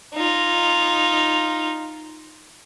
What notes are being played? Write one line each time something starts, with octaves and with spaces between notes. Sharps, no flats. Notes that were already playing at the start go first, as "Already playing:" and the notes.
D#4 F4